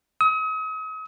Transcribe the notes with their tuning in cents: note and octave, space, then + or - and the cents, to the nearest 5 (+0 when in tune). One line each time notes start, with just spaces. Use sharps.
D#6 +40